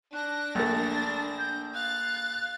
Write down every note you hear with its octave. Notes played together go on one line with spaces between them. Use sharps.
D4 F#6 A#6
A#1 A3 A6
G6
F5 F#6 A6